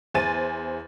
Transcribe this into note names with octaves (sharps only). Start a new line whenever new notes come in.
E2 C5 G#5 A6 D#7